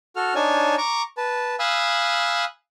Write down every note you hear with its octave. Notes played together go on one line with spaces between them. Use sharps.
F#4 A4 F6
D4 D#4 C#5 G#5 A5
A#5 C#6 D6
B4 A5
F5 G#5 B5 D#6 E6 F#6